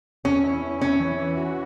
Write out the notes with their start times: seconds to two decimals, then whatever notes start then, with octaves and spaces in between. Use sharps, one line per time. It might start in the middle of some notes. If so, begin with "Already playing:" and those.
0.24 E2 C#4
0.44 E4
0.63 E2
0.81 E2 C#4
1.00 E3
1.18 E3
1.37 F#4